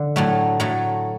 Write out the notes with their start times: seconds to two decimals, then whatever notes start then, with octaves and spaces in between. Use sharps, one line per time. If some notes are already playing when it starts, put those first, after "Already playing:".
Already playing: D3
0.16 A2 F#3 A3
0.60 A2 F#3 A3